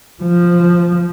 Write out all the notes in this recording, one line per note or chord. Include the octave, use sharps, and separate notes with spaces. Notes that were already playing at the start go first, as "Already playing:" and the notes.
F3